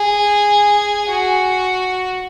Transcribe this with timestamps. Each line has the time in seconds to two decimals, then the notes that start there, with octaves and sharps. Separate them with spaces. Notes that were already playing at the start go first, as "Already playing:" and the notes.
Already playing: G#4
1.09 F#4